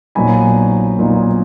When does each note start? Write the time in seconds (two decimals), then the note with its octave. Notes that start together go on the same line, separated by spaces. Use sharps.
0.15 A#1 A#2 F#3 B3 D#4 G#5 B5
0.98 A#1 A#2 F#3 B3 D#4